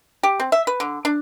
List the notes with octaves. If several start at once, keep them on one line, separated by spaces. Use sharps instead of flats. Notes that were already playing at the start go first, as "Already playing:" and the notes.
G4
C4
E5
B4
D3
D4